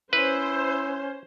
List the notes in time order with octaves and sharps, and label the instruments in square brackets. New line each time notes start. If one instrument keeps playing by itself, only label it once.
[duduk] C#4 [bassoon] E4 [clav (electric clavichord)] B4 [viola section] C5